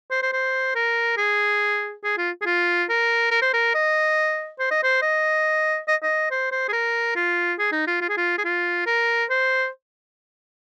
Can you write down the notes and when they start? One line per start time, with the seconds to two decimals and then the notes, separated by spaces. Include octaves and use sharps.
0.11 C5
0.23 C5
0.33 C5
0.76 A#4
1.18 G#4
2.04 G#4
2.18 F4
2.42 G#4
2.46 F4
2.90 A#4
3.31 A#4
3.42 C5
3.54 A#4
3.75 D#5
4.60 C5
4.71 D#5
4.83 C5
5.02 D#5
5.88 D#5
6.03 D#5
6.31 C5
6.52 C5
6.69 G#4
6.73 A#4
7.15 F4
7.59 G#4
7.72 D#4
7.87 F4
8.01 F4
8.09 G#4
8.17 F4
8.38 G#4
8.45 F4
8.87 A#4
9.30 C5